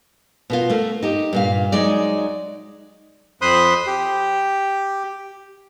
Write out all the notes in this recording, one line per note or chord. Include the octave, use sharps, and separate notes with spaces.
B2 A#3 F4
A3 A#3
D#4 G4
G2 A#2 F5
F#3 G#3 D#4 D5
F2 C5 B5 C6 D#6 F#6
G4